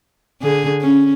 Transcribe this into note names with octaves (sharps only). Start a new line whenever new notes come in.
D3 G#4
C#4